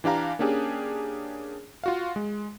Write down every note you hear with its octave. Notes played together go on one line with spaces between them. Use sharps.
E3 D4 G4 F5 A#5
A#3 C#4 D4 G4 G#4
F4 F#4 F5
G#3